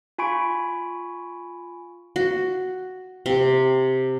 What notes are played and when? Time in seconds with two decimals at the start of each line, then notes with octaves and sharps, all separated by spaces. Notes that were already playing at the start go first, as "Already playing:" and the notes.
0.18 F4 G#5 B5 C#6 D7
2.16 F#4
3.26 C3